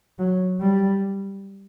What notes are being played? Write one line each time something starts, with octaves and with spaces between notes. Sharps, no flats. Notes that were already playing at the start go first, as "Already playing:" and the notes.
F#3
G3